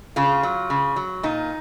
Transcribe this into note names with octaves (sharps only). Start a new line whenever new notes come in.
C#3 F4
F#3
C#3
F#3
A#2 D#4